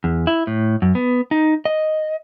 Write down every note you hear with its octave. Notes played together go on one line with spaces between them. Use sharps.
E2
E4
A2
F#2
B3
D#4
D#5